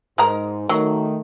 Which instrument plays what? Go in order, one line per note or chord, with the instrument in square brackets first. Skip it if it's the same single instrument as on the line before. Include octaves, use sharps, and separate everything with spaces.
[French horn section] G#2 [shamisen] G#3 A#4 A#5
[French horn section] D#3 A3 [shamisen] F#3